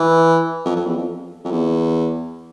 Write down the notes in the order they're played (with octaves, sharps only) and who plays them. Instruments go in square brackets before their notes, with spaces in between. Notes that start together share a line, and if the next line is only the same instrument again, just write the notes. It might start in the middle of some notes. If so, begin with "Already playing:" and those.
Already playing: [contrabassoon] E3
F2
F2
E2
F2
F2
E2